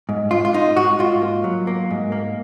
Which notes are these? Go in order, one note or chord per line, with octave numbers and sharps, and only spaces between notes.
G#2
G#2 F4
F4
G#2 D#4
G#2 F#4
G#2 F4
A#3
F#3
A#3
G#2
A#3